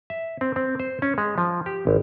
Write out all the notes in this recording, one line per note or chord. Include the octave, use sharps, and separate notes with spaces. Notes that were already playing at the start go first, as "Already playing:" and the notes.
E5
C4
C4
C5
C#4
G#3
F3
G4
G#1